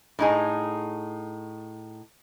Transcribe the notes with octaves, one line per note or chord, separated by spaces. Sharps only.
A2 D#4 G#4